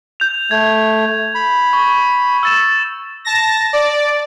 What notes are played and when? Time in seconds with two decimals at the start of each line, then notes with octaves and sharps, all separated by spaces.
0.20 G6 F7
0.51 A3 G#6
1.35 B5
1.73 C#6
2.43 E6 A6 E7
3.25 A5 A#6
3.73 D5